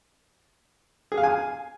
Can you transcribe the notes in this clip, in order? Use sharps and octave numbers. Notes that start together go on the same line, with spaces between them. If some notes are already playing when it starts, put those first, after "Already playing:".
G#4
F5
G#5